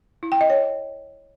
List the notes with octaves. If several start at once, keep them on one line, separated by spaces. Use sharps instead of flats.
E4
G5
D#5
C#5